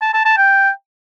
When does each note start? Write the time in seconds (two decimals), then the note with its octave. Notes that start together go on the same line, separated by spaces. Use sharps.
0.02 A5
0.14 A5
0.26 A5
0.38 G5